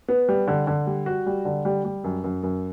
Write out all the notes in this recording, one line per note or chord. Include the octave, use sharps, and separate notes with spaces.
B3
G3
D3
D3
G3
F#4
G3
D3
G3
G3
F#2
F#2
F#2